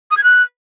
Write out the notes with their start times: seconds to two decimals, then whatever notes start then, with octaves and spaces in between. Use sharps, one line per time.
0.11 D#6
0.17 G#6
0.24 F#6